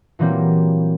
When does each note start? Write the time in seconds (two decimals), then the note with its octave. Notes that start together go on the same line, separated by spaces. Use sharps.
0.19 A#2 E3 F#3 G3 A#3 C4